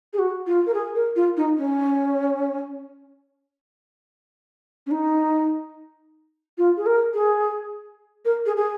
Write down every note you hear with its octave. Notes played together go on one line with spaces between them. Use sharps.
G#4
F#4
F4
A#4
G#4
A#4
F4
D#4
C#4
C#4
D#4
F4
G#4
A#4
G#4
A#4
G#4
G#4